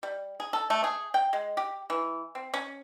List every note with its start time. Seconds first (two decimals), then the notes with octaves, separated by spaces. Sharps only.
0.03 G3
0.40 G#4
0.53 A4
0.70 A3
0.84 G#4
1.14 G5
1.33 G#3
1.57 G4
1.90 E3
2.35 C4
2.54 C#4